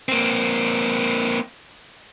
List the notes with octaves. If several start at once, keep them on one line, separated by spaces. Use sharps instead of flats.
A#3 C4